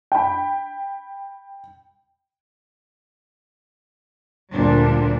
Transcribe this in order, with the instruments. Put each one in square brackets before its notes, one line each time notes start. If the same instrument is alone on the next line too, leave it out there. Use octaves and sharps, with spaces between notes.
[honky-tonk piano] G5 B5
[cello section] D2 A#2 D3 G3 D4